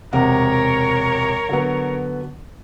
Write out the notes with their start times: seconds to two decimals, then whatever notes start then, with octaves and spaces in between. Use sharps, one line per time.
0.13 E1 C3 A#4 C#5 F#5
1.49 D3 F#3 B3